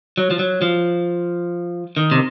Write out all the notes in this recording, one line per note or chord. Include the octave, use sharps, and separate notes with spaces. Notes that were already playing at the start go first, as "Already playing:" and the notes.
F#3
F3
F#3
F3
D#3
C3